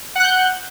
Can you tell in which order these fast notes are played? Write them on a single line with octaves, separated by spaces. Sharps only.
F#5 F#6 G6